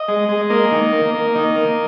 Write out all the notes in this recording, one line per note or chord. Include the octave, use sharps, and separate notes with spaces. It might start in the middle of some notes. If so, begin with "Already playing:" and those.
Already playing: D#5
G#3
G#3
A#3 D#5
D#3
A#3
A#3
D#3 D#5
A#3